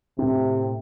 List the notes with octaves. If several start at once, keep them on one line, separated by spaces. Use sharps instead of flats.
A2 C3 C4